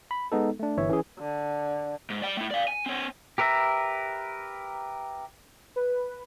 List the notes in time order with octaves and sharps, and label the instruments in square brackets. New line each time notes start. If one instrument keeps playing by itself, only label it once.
[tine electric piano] B5
G#3 B3 D#4 A4
A3 D4
G1 E3 C#5 E5
E3 C#4 G#4
[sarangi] D3
[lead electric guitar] G#2
D5 G5
A3 E4
D5 F5
G#5
C4 C#5
[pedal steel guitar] G4 A#4 B4 E5 A#5
[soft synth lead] B4